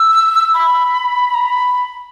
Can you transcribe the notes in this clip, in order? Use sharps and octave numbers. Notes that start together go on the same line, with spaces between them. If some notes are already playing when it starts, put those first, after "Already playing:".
Already playing: E6
B5
A#5
B5